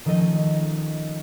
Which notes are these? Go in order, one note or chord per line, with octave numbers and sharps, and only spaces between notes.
D#3 F3 A3 C#4 D#5